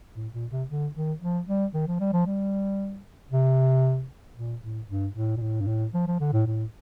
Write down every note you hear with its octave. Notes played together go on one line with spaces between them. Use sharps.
A2
A#2
C3
D3
D#3
F3
G3
D#3
F3
G3
F3
G3
C3
A#2
A2
G2
A2
A#2
A2
G2
A2
F3
F3
D3
A2
A2